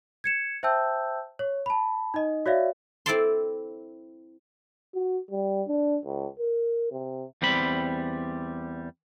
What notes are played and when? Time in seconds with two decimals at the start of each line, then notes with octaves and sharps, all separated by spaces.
0.24 G#6 C#7 E7
0.63 C5 E5 G5 A5 E6 G6
1.39 C#5
1.66 A5 B5
2.14 D#4 D#5
2.46 F#4 C#5 D5 E5 F5
3.06 C4 E4 A4 D5 A5 C6
4.94 F#4
5.31 G3
5.68 D4
6.05 C#2
6.39 A#4
6.91 C3
7.42 E2 G3 C4 B5